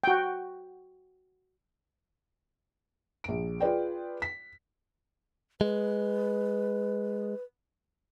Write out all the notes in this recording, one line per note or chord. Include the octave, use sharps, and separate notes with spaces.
F#4 G5
A#1 D7
F4 G#4 B4 D5 G5
B6
G#3 B4